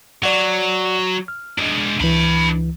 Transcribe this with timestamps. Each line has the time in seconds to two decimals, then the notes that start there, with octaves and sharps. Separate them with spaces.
0.23 F#3 D5 F#5
1.28 F6
1.58 G#3 D4
2.00 C#2 E3 D4 B5